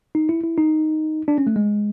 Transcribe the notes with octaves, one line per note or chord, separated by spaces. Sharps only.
D#4
E4
E4
D#4
D4
C#4
A3
G#3